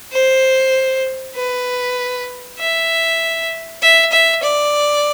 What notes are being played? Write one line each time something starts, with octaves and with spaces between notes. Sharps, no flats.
C5
B4
E5
E5
E5
D5